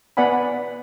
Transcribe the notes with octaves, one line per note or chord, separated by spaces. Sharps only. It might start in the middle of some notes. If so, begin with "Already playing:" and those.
B3 B4 D5 F#5 G#5 B5